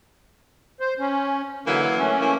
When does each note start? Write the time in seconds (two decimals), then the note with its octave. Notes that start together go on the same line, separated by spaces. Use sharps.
0.80 C5
0.99 C#4
1.65 D3 E3 F#3 A#3
1.98 A3 C#4
2.21 E3 A#3